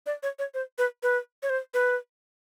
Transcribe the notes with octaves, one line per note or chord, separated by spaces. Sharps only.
D5
C#5
C#5
C5
B4
B4
C#5
C5
B4